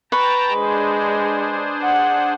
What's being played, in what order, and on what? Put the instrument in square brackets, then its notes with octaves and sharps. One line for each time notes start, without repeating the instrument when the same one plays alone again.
[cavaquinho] B4 C#6 [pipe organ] G5 A5 A#5
[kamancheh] G#3 [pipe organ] D4 G#4 C5
[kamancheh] F#5